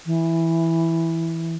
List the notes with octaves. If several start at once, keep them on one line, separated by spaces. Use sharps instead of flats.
E3